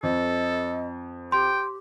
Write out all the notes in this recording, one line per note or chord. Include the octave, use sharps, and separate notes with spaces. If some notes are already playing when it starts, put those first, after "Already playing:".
F2 A4 D#5
G4 G5 C6